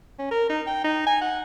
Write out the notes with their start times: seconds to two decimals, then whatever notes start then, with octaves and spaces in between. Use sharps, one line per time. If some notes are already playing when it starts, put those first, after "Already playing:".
0.19 C#4
0.31 A#4
0.49 D#4
0.67 G5
0.84 D#4
1.07 G#5
1.21 F#5